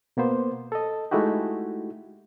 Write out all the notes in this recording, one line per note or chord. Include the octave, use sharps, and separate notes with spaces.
B2 A#3 B3 C5
A4 D#5
G#3 A3 D#4 E4 F#4 G4